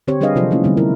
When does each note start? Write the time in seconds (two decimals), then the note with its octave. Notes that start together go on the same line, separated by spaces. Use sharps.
0.07 D3 C4 G4 C5 C#5
0.21 G3 D4 G#4 B4 D#5 F5
0.35 C3 F3 F#3 F4 A4 C5
0.51 A3 A#3 C#4 E4
0.64 D3 G3 A3 B3 C4 D#4
0.77 E4 A#4